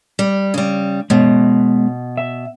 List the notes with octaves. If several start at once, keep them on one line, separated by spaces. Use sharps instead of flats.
G3
C#3 G3
B2 G#3 B3 C#5
E5